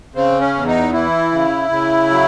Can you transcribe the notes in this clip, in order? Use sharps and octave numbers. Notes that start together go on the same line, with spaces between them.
C#3 C4
C#4
E2
D#4
E3 E4
C#3
C#3
F#3